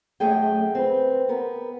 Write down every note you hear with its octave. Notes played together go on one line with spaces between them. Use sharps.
F#2 A3 G#4 G5
C4 B4
B3 A#4